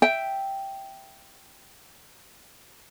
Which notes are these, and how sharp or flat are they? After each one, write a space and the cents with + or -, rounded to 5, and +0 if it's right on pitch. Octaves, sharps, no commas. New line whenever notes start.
E5 +0 G5 -5